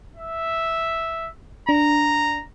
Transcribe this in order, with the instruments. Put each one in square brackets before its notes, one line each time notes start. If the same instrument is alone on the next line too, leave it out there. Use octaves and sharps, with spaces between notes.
[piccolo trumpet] E5
[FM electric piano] D4 [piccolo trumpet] A#5